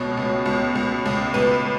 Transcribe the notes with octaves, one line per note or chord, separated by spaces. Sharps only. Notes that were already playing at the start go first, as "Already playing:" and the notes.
Already playing: C#2 B2 C#5
C#2
C#2
C#2
C#2
C#2 B4